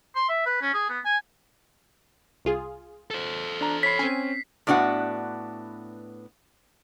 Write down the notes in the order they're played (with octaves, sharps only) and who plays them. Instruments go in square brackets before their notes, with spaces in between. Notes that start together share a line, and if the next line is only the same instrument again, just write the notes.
[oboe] C6
E5
B4
C#4
G#4
B3
G#5
[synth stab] C2 F4 G#4
[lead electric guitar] A4 C5
[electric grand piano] D4 A#5
[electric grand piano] C#5 B5 [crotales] B6 C7
[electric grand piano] C4 C#4 [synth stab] G#5
[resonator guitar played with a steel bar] A2 B3 D4 F#4 B4 F#5